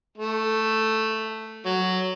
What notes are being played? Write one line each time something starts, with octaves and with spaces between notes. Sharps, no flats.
A3
F#3